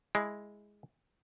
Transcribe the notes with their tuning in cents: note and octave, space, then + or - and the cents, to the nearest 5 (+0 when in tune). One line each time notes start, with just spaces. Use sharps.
G#3 +0 E4 +0